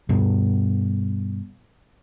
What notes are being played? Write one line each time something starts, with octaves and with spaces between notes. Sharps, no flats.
G2 B2